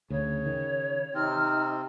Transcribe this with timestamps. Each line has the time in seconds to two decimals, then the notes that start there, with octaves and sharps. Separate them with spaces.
0.10 D2 C#3 C#5
0.46 D#3
1.14 C3 C4 D#4 F6